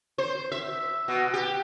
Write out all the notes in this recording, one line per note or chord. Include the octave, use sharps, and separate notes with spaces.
C5
E5
B2
G4